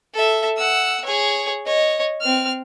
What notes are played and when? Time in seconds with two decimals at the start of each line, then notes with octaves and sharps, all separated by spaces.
0.14 A4 E5
0.58 F#5 E6
1.05 G#4 C#5
1.66 C#5 D#5
2.21 C4 F6